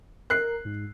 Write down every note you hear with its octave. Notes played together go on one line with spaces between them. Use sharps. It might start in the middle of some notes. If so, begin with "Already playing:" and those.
A#4 F#6 C7
G#2